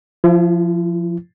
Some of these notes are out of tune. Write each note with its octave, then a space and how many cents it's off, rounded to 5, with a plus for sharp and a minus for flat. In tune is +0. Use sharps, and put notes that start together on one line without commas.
F3 +0 E4 +40